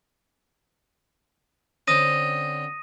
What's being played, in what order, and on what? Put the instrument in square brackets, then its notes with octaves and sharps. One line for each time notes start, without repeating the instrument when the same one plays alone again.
[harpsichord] D3 C4 C#4 [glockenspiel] D#6 A#6 D#7